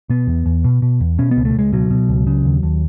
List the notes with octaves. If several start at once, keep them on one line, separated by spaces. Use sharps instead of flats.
B2 B3
E2
E2
B2
B2
E2
B2 C#4
B3
C#2
A3
C#2 G#3
B2 F#3
B2
C#2
C#3
D#2
D#2